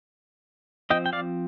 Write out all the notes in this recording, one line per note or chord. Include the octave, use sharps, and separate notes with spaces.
F3 C4 D#5 G5
G5
D5 F5